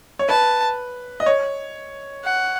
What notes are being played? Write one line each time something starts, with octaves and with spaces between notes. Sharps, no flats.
C#5
B4 A5
D#5
C#5
F#5